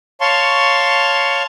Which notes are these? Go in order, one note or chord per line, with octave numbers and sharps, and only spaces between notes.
C#5 F5 A5 C6 C#6